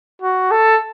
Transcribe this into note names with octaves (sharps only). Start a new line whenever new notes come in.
F#4
A4